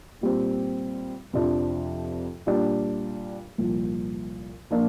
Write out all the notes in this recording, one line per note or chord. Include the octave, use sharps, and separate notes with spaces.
A#2 G3 C4
F2 C3 F3 D4
A#2 G3 D4
C2 A#2 F3
A#2 F3 A#3 D4